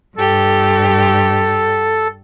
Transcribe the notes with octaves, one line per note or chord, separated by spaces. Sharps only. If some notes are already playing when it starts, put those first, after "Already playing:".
G2 G4 A4